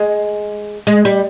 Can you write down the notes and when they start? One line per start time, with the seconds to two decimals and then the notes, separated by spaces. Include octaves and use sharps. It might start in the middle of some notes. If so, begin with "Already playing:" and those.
Already playing: G#3
0.87 G#3
1.05 G3